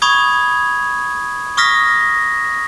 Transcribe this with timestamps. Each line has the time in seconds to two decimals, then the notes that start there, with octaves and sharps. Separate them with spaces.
0.02 B5 C#6 D#6 G#6
1.57 C#6 D#6 F6 A#6 B6